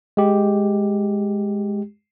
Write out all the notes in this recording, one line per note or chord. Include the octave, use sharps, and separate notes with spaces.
G#3 G4